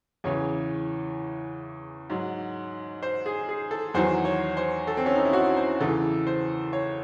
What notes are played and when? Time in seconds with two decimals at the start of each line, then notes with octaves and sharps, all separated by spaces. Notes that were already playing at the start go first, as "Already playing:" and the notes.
0.24 E2 C#3 E3 C#5
2.10 G#2 F#3
3.03 C5
3.26 G#4
3.49 G#4
3.71 A4
3.94 E2 D#3 F#3 C5
4.25 C#5
4.57 C5
4.87 A4
4.97 C4
5.06 C#4
5.15 D#4
5.25 E4
5.33 F#4
5.57 C5
5.80 E2 C#3 E3 A4
6.27 C5
6.73 C#5